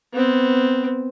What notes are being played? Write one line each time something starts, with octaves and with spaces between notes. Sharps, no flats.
B3 C4